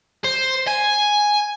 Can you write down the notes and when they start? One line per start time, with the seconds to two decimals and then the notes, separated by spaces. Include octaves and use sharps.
0.25 C5
0.68 G#5